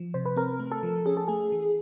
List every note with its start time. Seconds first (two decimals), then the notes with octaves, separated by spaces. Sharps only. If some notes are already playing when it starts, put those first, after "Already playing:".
Already playing: F3
0.14 C3 C5
0.25 B4
0.36 C4 A#4
0.60 A3
0.71 A4
0.83 F3
1.06 C#4 G#4
1.17 A4
1.28 A3 G#4
1.52 E3